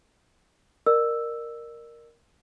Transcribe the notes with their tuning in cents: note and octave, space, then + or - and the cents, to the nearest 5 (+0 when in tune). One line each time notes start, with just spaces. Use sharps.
A#4 +0 D5 +45 E6 +0